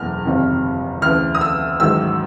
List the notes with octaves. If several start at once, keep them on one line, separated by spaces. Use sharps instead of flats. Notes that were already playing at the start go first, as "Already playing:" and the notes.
Already playing: F#1 E2 B2 F6
G1 F2 C3 D#3
D2 C#3 E3 F6
D#6
E6
A1 G#2 D#3 F#3 E6